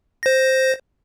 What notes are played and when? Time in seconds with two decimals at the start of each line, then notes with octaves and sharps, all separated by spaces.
0.23 C5 A#6